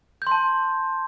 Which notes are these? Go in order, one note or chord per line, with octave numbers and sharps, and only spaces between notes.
A5 C6 G6